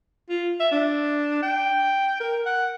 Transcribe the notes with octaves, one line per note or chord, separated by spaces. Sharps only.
F4
E5
D4
G5
A#4
F#5